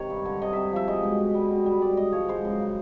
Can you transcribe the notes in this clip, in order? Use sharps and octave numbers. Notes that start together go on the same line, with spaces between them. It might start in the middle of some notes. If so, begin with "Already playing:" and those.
Already playing: C3 D#3 C#5
G2
D3
C3 D#5
C3 E5
F3 E5
G#3 D#5
B2
G#3
G3
B2
G3
G#2 D5
G#2 D#5
F3 C#5
G#3 C5
F#2
C#3